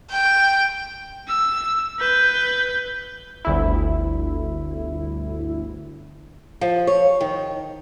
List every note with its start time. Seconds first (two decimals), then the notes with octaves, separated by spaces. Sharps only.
0.11 G5
1.28 E6
1.99 B4 G6
3.45 G1 D2 E4
6.61 F3
6.87 C#5
7.21 D#3